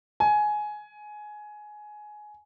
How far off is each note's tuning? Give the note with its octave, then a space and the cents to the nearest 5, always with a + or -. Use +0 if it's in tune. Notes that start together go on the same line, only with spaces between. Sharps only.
G#5 +15